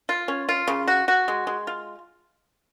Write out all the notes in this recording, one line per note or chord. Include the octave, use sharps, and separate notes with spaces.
F4
C#4
F4
C#3
F#4
F#4
G#3
G#3
F4